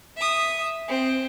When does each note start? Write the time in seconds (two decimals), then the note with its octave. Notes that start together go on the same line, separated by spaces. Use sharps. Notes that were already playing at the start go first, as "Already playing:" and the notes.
0.17 E5 D#6
0.88 C4